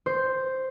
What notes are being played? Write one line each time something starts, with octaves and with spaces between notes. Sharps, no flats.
C5